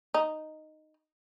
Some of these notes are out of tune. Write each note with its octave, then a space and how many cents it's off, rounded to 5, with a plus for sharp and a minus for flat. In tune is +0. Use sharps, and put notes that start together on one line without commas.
D#4 -5